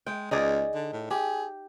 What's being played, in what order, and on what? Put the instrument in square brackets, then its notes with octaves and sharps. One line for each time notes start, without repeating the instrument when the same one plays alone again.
[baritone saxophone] G#3 [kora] G5
[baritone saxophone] C#2 [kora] D#4 G#4 D5
[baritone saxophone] D3
A2
[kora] G4 [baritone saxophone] G#4